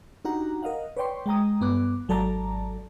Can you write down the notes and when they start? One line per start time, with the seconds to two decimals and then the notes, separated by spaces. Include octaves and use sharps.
0.25 D4 D#4 F#4 G4 F#5 A#5
0.63 A#4 D#5 F5 F#5
0.97 B4 C#5 D5 G5 C6 C#6
1.26 G#3 G5 A#5 D#6
1.61 G2 B3 D6 F#6
2.09 G#1 F#3 A4 D5 A5 A#5